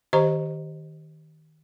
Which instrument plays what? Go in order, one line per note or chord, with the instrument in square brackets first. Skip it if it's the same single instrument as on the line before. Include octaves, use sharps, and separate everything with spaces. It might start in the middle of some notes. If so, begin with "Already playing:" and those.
[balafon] D#3 G4 C5 D#5 A#5